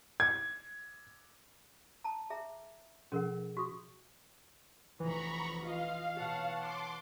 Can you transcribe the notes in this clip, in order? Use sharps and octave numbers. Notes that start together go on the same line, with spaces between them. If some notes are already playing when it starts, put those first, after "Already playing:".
G#6
A5 A#5
G#4 E5 A#5
B2 F3 C#4 G#4 A#4 F#5
F4 F#4 C#6 D#6
F1 E3 A#5 B5 C#6
F4 D#5 F5
B2 C#5 F#5 A5
C6 D6